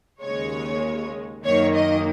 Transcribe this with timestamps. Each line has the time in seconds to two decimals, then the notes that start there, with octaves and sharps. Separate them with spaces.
0.21 D#2 C#3 G#3 C#5
1.44 F#2 D#3 A#3 C#5
1.75 D#5